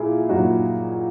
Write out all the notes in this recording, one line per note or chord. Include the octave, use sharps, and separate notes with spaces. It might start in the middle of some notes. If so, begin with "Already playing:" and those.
Already playing: A#2 E4 G#4
A#2 F#3 D#4 F#4